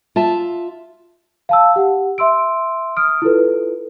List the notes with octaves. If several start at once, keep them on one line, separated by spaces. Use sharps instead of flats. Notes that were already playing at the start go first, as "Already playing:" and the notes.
F4 E5 A5
F5 A5 E6
G4 F#5
E5 C6 E6 D7
D#6 F6 D7
E4 F4 A4 B4